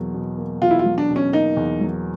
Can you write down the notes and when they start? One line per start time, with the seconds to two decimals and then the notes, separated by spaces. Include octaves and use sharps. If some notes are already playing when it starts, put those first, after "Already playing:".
Already playing: E2 B2 F#3 A#3
0.14 B2
0.38 A#3
0.62 E2 F4
0.71 E4
0.79 F4
0.86 F#3
0.98 D4
1.09 B2
1.16 C#4
1.33 A#3 D#4
1.57 E2
1.81 F#3